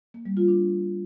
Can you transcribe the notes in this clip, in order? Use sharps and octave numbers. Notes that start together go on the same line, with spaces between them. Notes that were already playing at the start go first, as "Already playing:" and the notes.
A#3
G3
F4
D4